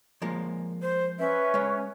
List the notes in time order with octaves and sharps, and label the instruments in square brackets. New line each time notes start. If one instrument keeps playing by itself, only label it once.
[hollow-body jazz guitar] F3 G#3 A#3
[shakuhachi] C5
[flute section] C#4 B4 [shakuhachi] E5
[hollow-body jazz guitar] G#3 C#5